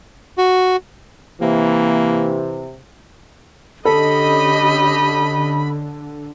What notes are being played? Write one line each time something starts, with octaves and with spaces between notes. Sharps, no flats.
F#4
C3 E3 A#3
D3 C#4 G4 A4 D#5 B5